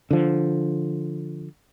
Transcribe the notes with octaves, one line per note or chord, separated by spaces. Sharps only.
D3 F3